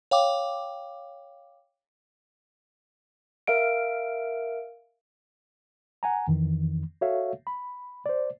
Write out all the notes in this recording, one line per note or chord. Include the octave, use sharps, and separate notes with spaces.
C#5 F5 G5 D6
A#4 E5 F5 D7
F#5 G#5 A#5
F2 D#3 E3
F#4 A4 C#5 E5 F5
B5
C5 D5